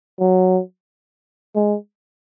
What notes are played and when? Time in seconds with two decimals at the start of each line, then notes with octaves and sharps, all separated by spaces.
0.20 F#3
1.55 G#3